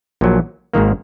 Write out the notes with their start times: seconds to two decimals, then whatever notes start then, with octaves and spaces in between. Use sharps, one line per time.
0.21 A#1 A#2 F#3
0.74 G#1 G#2 D#3 A#3